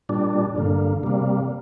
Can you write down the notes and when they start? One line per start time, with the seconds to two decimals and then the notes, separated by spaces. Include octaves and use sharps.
0.09 A#2 G3 D4
0.55 G2 D3 A#3
1.03 C3 G3 A#3